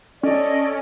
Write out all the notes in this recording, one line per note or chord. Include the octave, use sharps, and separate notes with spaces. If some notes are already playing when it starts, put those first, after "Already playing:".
C#4 A4 D5 D#5